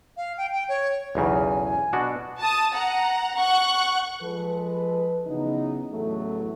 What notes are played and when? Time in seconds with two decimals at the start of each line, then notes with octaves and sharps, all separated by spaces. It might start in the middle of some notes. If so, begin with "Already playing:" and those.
0.17 F5
0.38 G5
0.53 G5
0.69 C#5
1.15 B1 E2 C#3 G#5
1.93 B2 D4 F#4
2.40 A5 D#6
2.74 F#5 A#5
3.35 F#5 C#6 F#6
4.22 F3 G#3 A4 B4
5.27 C#3 E3 F#3 B3 D#4
5.91 A1 E2 C#3 F#3 A3